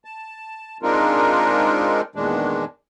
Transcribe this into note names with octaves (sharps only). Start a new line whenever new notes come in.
A5
G#3 C4 D4 D#4 F4 A#4
E2 A#2 D#3 G#3 D4